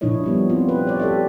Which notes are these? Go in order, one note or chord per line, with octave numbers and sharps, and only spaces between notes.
A#2 F3 D4 E4 C#5 D#5
F3 G3 B3
C4 F4
B4
C#5 D5
G4 A4 E5